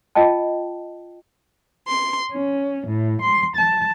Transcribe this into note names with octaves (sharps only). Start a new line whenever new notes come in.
F4 D#5 G5 A5
C6
C#4
A2
C6
A5